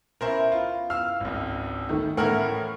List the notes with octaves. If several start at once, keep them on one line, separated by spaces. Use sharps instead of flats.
B3 C#4 E4 A#4 C5
F4
F5 E6 F6
G#1 C#2
D#3 A3
A2 E3 A3 C#4 A#4 F#5 F6